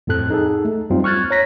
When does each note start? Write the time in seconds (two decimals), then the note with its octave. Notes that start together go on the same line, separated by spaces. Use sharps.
0.07 F2 A2 C4 A4 F#6
0.30 D#4 G#4 A4
0.65 A3
0.90 F#2 G3 C4 D#4 F4
1.04 C#6 F6 F#6 G#6 A6
1.31 C#5 A#5 A#6 B6